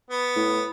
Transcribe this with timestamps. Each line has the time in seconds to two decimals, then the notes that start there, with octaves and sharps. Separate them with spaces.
0.11 B3
0.36 A2